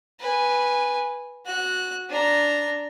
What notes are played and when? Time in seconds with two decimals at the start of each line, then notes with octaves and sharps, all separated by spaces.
0.20 B4 G#5
1.46 F#4 F#6
2.09 D4 A#5